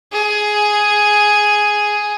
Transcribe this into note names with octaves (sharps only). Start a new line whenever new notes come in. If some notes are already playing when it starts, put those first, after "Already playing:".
G#4